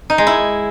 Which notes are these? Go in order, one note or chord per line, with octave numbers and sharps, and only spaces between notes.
D#4
G#3
E4